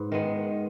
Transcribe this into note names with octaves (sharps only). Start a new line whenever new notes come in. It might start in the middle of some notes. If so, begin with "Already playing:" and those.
Already playing: G#2 B4
D#3 G#3 B3